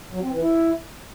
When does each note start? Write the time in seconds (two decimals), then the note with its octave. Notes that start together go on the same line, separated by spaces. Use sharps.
0.12 F#3
0.21 C4
0.31 E3
0.41 E4